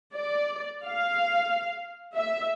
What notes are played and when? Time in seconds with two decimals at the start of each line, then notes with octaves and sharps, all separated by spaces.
0.13 D5
0.84 F5
2.15 E5